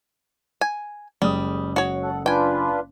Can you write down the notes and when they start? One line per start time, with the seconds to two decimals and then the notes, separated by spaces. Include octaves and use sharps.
0.61 G#5
1.22 F#1 G3 G#3 D#6
1.76 F#4 C#5
2.03 A4 F#5
2.26 D4 F4 B4 G5 G#5